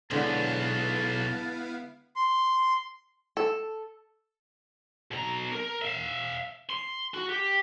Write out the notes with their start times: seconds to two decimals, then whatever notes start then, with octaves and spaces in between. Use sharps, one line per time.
0.11 B1 D3 G#3 B3 E4 F5 A5
2.16 C6
3.37 A4
5.11 B2 A#5
5.52 A#4
5.82 E5 F5
6.69 C6
7.14 F#4
7.29 G4